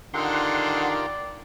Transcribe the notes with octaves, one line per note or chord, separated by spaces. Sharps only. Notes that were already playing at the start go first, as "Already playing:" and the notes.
D3 D#3 F4 G4 A#4 D5 F#5 C6